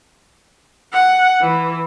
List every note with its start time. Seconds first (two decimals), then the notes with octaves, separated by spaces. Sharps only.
0.93 F#5
1.41 E3